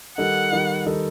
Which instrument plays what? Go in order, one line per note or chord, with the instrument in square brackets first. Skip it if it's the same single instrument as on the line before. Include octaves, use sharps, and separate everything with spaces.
[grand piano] D#3 G3 D#4 A4 [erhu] F#5
[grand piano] D#3 G3 D#4 A4
D#3 G3 D#4 A4